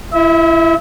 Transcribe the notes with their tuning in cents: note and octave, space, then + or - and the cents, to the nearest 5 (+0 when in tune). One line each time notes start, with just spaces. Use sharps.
E4 +25 E5 -35